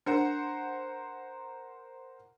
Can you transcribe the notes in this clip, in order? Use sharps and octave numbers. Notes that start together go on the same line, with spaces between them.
D4 A#4 C5 F#5